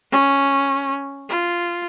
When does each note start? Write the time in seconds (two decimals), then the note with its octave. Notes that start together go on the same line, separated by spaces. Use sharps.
0.12 C#4
1.29 F4